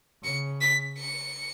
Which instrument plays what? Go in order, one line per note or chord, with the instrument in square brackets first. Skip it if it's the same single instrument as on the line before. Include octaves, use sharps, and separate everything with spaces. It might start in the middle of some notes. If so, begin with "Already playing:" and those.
[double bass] C#3 [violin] C#7
[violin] B6
C#7